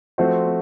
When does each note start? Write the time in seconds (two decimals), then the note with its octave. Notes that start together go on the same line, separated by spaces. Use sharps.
0.18 F3 A3 C4 F#4 C5
0.47 C4